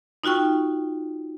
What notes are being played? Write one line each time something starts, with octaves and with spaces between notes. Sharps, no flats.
D#4 F4 F#4 G5 C#6